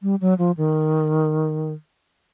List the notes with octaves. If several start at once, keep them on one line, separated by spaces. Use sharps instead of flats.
G3
F#3
F3
D#3